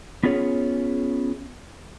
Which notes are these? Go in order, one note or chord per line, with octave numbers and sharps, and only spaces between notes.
B3 C#4 F4 G#4 C#5